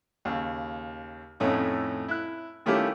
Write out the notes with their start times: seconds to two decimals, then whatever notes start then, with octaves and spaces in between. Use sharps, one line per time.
0.25 D#2 C#3
1.40 F2 A2 A3 C#4 D#4
2.08 E4 F#6
2.66 D#3 A3 C#4 E4 F4 G4